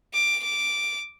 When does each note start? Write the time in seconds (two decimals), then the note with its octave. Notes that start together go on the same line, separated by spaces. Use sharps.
0.13 D6
0.43 D6